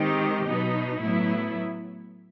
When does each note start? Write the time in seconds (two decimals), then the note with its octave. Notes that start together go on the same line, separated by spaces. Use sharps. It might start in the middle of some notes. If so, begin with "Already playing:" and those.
Already playing: D#3 G#3 C4 D#4 G4
0.45 B2 F#3 B3 D#4
1.01 A2 F#3 B3 E4